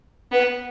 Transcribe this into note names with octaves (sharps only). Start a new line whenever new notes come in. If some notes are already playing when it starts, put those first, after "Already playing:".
B3